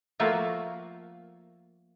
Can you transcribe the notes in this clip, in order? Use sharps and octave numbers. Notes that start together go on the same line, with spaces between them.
F3 A3 A#3 F4 F#4